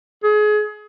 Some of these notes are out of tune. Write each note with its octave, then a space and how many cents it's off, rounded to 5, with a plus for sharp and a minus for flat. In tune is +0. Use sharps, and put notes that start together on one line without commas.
G#4 +30